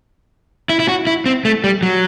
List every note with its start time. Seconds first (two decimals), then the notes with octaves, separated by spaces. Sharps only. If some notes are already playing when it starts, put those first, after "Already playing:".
0.69 E4
0.80 E4
0.88 F#4
1.07 E4
1.26 C4
1.45 A3
1.64 G3
1.83 F#3